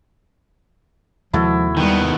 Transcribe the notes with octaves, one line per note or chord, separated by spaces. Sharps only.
D#2 C3 F3 G#3 E4 F#4 A4
D#3 G3 B3 G5